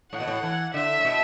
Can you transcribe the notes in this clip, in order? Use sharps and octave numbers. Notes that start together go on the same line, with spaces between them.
A2 F#5
B2
A2
E3
D3 E5
A2
B2